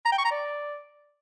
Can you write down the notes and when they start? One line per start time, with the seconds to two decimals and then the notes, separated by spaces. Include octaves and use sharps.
0.06 A#5
0.12 G5
0.18 C#6
0.25 A#5
0.31 D5